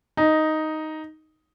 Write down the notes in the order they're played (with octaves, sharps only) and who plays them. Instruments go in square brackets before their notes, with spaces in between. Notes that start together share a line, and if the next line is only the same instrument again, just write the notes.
[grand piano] D#4